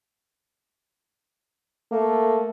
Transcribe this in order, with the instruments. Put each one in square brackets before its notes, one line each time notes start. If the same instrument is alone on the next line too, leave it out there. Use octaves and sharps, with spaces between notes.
[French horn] A3 [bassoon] A#3